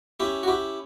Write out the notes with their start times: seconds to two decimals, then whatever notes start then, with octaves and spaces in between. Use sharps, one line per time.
0.20 C#4 E4 G4
0.43 F#4
0.48 E4 G4